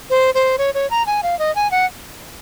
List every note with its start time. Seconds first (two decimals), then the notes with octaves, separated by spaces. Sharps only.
0.10 C5
0.35 C5
0.58 C#5
0.74 C#5
0.90 A#5
1.07 G#5
1.23 F5
1.39 D#5
1.55 G#5
1.71 F#5